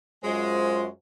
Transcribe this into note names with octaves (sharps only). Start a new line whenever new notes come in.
F#2 G#3 F4 C5